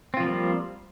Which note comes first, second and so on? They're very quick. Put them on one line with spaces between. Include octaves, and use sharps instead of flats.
C4 F4 F3 A#3 G3